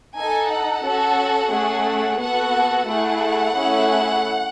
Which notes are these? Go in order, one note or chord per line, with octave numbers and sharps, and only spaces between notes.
D#4 A4 G#5
F#5
C#4 F#4 A4
A3 C#4 G#4
B3 F#4 A4 F#5
A3 E4 G#4 F#5
A3 C#4 E4 G#4